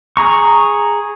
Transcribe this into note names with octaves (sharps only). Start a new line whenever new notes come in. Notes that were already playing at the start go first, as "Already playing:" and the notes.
G#4 A#5 C#6